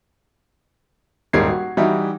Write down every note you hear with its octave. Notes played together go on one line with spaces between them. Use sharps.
D#1 G#2 G3 A#4 G#6 C7
F#4
E3 G3 D#4 E4 F#4